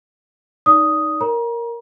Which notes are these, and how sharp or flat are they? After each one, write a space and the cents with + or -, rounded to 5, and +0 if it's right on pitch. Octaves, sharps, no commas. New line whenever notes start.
D#4 +0 D5 -30 D#6 +0
A#4 +0 C#5 +0 A#5 +35